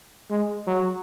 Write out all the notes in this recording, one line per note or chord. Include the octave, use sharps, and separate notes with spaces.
G#3
F#3